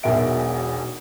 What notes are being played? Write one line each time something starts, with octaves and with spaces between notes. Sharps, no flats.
E1 B1 B2 A#4 E5 D7